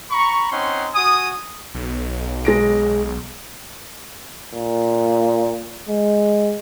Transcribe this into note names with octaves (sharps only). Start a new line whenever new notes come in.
A#5 B5 C#6
C4 C#4 D#4 F#5 C6
F#4 G#5 D#6
B1
G#3 A#6 D7
A#2
G#3